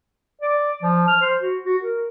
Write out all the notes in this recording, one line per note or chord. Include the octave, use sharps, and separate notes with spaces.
D5
F3
F6
C5
F#4
F#4
A#4